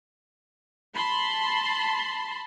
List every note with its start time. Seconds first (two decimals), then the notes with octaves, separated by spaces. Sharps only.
0.95 A5 B5 C6